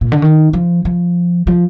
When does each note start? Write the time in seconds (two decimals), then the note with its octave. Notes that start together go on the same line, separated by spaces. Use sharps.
0.01 A#2
0.12 D3
0.22 D#3
0.53 F3
0.85 F3
1.47 F3